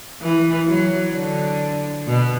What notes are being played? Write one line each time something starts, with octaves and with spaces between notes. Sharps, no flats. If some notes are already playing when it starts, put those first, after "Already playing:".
E3
F#3
D3
B2